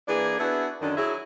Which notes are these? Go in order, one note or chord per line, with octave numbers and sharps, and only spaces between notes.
E3 A#3 D4 G#4
B3 D4 E4 F#4 G#4 B4
F#2 D3 D#3 C#4 D4
F#3 E4 G#4